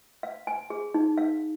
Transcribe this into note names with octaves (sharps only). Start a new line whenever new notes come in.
F5
G#5
G#4
D#4
F5